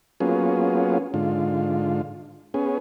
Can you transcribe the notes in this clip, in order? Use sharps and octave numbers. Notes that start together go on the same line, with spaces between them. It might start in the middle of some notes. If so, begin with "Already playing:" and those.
F#3 A#3 B3 C#4 F4 G#4
G#2 D3 F4
B3 C#4 G#4